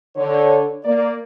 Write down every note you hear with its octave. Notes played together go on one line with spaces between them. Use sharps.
D3 C#5
A#3 D5